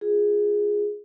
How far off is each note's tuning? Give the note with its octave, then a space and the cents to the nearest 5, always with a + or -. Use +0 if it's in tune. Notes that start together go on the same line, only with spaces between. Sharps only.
F4 +0 G#4 -5